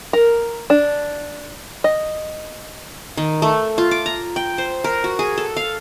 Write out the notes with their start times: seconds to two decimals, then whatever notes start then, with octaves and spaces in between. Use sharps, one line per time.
0.13 A#4
0.70 D4
1.84 D#5
3.17 D#3
3.42 A3
3.78 F4
3.91 D6
4.06 A#5
4.36 G5
4.58 C5
4.84 A#4
5.04 F#4
5.19 G#4
5.38 A4
5.57 F5